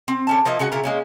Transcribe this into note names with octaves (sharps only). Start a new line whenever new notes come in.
C4
D3 C#4 A5
F3 A#3 D#4 E4
C#3 G#3 F#4 F#5
A#2 C#3 E4 A#4
G#3 A#3 C#4